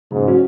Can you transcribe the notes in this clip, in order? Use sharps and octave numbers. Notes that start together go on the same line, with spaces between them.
G#2 C#3
F#3 C#4 F#4